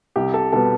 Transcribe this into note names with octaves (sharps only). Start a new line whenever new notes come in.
C2 G4
A4
B2 G3 B3 A4